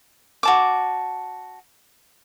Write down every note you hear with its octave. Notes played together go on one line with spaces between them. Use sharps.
F#4 A5 D6